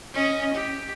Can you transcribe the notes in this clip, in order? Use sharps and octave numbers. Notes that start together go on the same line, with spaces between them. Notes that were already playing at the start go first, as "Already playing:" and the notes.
C#4 D#5
G4